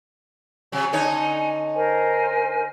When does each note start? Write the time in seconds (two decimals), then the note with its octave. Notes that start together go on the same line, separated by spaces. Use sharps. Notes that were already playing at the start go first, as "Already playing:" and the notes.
0.72 C3 F#3 G#5
0.93 D3 D#4 C#5
1.74 A#4 C5 G#5